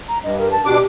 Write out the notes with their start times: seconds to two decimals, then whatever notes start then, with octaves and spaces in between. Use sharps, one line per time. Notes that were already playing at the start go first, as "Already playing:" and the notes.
0.08 A#5
0.23 G2 D#5
0.38 A#4
0.51 A5
0.65 B2 D4 G4 D6